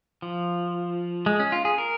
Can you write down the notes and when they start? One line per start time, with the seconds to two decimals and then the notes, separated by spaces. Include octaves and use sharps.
0.22 F3
1.26 G#3
1.40 C#4
1.52 F4
1.65 G#4
1.78 A#4